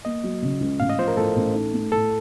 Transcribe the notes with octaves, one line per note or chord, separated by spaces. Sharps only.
A#3 D#5
F#3
C#3
C#2
A1 F5
D#5
F3 C5
A#4
A2 A4
A1
D#4
A3
A2 A4